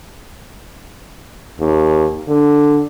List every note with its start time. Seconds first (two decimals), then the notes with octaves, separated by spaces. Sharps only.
1.60 D#2
2.28 D3